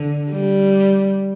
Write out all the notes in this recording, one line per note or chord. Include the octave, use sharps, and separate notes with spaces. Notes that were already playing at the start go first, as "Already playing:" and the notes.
Already playing: D3
G3